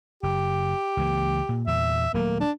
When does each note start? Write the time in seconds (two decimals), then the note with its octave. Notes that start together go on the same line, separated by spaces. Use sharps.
0.23 F#1 G4
0.97 C#2 E3 A#3
1.49 A#2
1.67 E2 A#2 E5
2.14 D#1 F#3 A3 A#3
2.40 D4